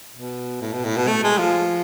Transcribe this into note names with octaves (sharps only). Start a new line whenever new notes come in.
B2
A2
B2
A2
B2
A3
G#3
F3